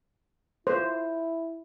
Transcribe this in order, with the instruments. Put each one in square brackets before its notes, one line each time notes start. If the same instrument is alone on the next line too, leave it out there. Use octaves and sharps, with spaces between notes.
[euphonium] E4 [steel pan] C5